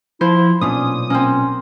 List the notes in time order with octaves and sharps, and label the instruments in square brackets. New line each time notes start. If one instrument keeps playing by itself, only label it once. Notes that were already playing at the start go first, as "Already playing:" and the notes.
[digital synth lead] F3 [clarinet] E4 [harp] C5
[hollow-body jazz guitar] B1 A#2 D4 [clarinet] C#4 [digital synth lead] D#6
[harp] A#3 C4 [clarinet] C#4